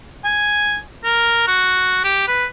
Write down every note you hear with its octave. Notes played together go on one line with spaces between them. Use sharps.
G#5
A#4
F#4
G4
B4